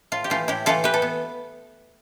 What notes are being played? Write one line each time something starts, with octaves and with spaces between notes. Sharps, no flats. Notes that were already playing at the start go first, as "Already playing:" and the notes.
A2 F4
G4
E3 A3 E4 F4
A2 E4 G4
E3 A3 E4 F4 A4
E3 G4 B4
A4
B3